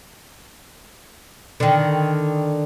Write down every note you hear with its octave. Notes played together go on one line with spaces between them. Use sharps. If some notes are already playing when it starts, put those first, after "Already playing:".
D3 D#3